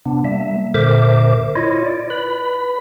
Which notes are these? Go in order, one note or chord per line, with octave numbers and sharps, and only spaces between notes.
C3 B3 D4
G3 A#3 E5
A#2 D3 A#4 C5 E5 D6
E4 F4 C#5 D#5
D5
B4 B5